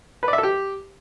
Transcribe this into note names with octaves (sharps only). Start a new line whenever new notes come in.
B4
D5
E5
A4
G4